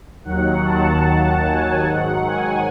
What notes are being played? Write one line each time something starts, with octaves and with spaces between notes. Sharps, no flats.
D#2 D#3 F#3 F#5
A5
A5
G#5
G#2 D#3 F#3 F#5
G#5